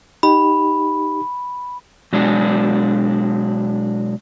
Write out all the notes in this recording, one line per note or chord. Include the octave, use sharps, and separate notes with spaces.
D#4 G4 B5
B2 F#3 G#3 D4